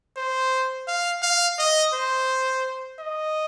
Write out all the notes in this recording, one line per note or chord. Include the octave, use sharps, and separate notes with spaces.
C5
F5
F5
D#5
C5
D#5